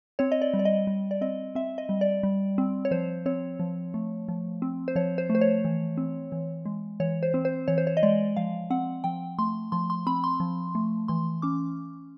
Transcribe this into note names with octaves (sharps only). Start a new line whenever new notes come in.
C4 C#5
D#5
D5
G3
D5
D#5
G3
D5
C4 D#5
C4 E5
D#5
G3
D5
G3
C4
C#5
F3 C5
C4 C#5
F3
A3
F3
C4
C5
F3 C#5
C5
A3
C5
C#5
E3
C4
E3
G#3
E3 C#5
C5
C4
C5
E3 C#5
C5
C#5
D#5
G#3 D5
F3 F5
C4 F#5
F3 G5
A3 C6
F3 C6
C6
C4 B5
C6
F3
A3
E3 C6
C#4 D6